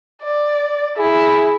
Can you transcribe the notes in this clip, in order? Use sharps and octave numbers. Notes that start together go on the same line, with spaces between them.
D5
E4 G#4